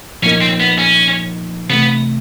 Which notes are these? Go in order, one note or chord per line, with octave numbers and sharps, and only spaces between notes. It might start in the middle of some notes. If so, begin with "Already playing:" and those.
A#2 F3 A#3 C#4 D#4
C4
B3
C#4
C3 E3 A3 B3